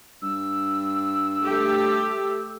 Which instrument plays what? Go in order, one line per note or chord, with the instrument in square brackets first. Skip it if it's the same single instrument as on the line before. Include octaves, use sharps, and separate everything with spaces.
[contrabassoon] G2 [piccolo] E6
[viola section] A3 G4